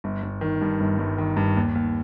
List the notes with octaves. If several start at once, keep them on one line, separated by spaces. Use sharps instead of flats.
G1
G1
D#3
G2
G1
G1
D#3
G2
D#2
D#2